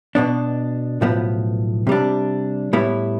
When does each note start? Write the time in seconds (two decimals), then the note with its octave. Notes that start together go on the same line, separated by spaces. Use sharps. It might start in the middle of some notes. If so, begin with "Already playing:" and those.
0.15 B2 B3 D4
1.01 B1 A2 F3 B3
1.87 C3 G3 D4
2.73 A2 G3 B3 E4